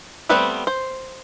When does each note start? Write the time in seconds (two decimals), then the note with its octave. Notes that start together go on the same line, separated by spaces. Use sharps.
0.29 G3 A3 B3 C4 B4
0.67 C5